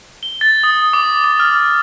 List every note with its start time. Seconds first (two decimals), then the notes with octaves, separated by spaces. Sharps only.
0.23 G7
0.41 A6
0.63 D#6
0.93 D6
1.24 D6
1.40 F6